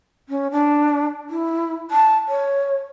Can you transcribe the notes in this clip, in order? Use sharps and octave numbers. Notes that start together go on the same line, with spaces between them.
C#4
D4
E4
A5
C#5